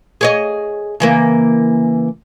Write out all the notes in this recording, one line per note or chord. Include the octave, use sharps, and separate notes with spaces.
G#4 C#5 D#5
C#3 E3 A#3